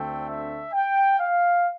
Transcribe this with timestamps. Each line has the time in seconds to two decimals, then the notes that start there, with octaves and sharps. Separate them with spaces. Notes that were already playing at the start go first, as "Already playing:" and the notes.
Already playing: D2 D3 A3 C4 G5
0.28 E5
0.73 G5
1.20 F5